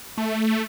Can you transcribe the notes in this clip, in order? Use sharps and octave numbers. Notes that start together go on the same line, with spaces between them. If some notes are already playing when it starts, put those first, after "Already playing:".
A3